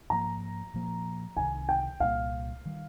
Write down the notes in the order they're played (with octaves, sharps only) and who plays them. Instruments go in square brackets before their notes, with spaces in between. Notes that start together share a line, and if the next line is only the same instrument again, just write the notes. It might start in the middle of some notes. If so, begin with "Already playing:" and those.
[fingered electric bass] G#2 F3 A#3 [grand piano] A#5
[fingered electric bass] A#2 F3 A#3
[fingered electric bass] C2 C3 D#3 [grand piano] G#5
[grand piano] G5
[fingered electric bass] C2 A#2 G3 A#3 [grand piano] F5
[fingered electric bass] D#3 G3